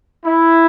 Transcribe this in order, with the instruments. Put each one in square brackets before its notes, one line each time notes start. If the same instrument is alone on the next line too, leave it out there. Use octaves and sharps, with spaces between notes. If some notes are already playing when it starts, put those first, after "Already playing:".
[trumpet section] E4